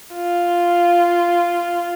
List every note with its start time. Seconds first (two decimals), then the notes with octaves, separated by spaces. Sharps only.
0.15 F4